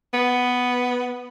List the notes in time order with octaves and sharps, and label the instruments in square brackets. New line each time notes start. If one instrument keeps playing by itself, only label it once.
[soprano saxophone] B3